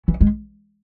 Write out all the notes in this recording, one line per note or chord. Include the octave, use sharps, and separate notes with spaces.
E3
G#3